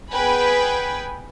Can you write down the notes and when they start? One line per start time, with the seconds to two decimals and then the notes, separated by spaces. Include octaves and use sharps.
0.12 B3 G#4 B4 G5 G#5 B5